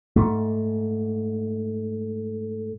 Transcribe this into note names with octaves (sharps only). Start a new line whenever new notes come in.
G#2 A3